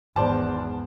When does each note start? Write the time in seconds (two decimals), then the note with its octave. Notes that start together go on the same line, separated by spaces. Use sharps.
0.16 G#1 E2 G#2 C5 D5 A5